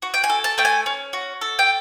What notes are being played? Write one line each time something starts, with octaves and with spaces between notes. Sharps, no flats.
F#4
G5
G#5
A4
A5
A3 G5
G#5
C#4
F#4
A4
G5